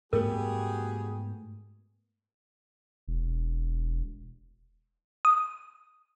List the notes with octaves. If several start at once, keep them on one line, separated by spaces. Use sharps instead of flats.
G#2 G3 A3 B3 F#4 G#4 A#4
E1
D#6